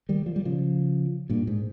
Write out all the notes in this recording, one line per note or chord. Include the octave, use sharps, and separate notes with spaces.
D#3 G3
F3
G3
C#3 F3
G2 A#2
G#2